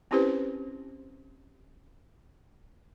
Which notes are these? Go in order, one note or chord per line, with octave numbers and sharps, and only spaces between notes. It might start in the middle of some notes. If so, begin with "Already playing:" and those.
C4 C#4 E4 G4 B4 C5